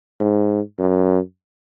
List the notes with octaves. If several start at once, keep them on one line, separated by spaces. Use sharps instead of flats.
G#2
F#2